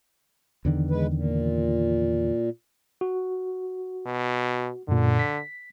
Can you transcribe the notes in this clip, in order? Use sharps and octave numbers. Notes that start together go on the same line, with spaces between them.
E2 D3 D#3
G#3 B4
A#2
F#4
B2
F#2 A#2 D3
B6